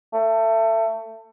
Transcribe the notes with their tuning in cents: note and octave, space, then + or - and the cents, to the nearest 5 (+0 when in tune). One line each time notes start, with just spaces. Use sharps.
A3 +25